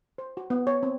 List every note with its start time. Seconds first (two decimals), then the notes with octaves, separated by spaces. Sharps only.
0.18 C5
0.37 F#4
0.50 B3
0.67 C#5
0.83 C4